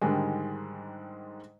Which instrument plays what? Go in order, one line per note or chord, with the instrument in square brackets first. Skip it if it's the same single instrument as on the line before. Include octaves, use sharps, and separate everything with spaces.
[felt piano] G#2 D3 D#3 G3 G#3